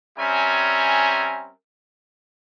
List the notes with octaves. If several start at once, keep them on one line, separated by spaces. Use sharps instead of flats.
G3 C4 C#4 A#4 E5 G#5